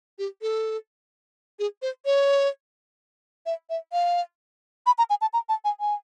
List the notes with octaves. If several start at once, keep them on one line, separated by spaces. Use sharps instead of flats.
G4
A4
G#4
C5
C#5
E5
E5
F5
B5
A#5
G#5
A5
A#5
A5
G#5
G#5